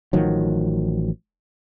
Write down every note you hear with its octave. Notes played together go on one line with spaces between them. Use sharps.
A1 D#3 F3 F#3